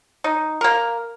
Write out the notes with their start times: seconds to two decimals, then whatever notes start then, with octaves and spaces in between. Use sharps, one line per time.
0.24 D#4
0.61 A#3 A#4